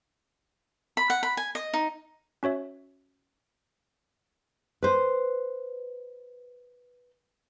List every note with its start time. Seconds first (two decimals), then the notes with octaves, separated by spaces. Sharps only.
0.97 B5
1.10 F#5
1.23 B5
1.37 G#5
1.55 D#5
1.73 D#4
2.43 C#4 F#4 C#5 E5
4.83 B4 C5